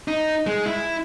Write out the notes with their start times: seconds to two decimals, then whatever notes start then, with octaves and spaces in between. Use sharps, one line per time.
0.08 D#4
0.46 G#3
0.66 E4